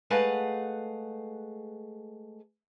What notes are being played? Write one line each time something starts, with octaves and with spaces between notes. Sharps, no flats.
G#3 A3 B4 F5 F#5